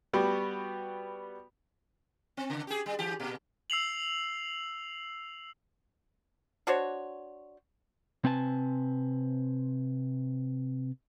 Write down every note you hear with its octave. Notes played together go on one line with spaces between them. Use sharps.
G3 B3 F#4 G4
C4
C#3
G4 G#4
G3
E3 G4
A#2
E6 C7 F7 F#7
D4 F#4 C5 C#5
C3 C4 B4 G#5 A5